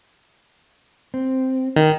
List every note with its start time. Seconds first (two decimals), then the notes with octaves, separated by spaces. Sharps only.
1.14 C4
1.76 D#3